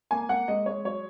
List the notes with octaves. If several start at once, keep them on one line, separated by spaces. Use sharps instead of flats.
A#3 G#5
A#3 F#5
G#3 D#5
G#3 C#5
F#3 C#5